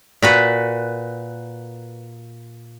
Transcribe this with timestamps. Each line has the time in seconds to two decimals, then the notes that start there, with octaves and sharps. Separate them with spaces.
0.22 A#2 F#4 B4